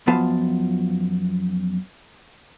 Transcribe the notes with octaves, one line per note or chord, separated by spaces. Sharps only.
F#2 F3 B3 F4 A5